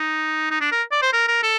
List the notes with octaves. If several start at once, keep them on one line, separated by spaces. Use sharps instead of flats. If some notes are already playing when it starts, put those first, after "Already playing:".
Already playing: D#4
D#4
D4
A#4
D5
C5
A#4
A#4
A4